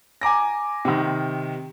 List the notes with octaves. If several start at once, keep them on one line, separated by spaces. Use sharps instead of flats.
G#5 A#5 D6 A#6
C3 D#3